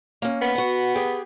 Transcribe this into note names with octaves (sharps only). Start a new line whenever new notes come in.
A#3 C#4
B3
F#4 F#5
G4 G#4 G5